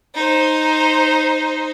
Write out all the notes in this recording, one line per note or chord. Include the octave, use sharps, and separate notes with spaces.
D#4 C5